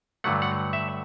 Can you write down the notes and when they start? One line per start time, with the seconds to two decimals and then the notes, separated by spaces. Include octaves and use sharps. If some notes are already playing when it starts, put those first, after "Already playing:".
0.24 G2 D3 F#3 A3 F#5
0.42 F#5
0.73 E5